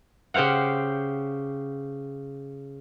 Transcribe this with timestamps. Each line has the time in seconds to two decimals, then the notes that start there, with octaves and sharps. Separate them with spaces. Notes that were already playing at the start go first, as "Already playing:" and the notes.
0.34 C#3 G4 C5 F5 F#5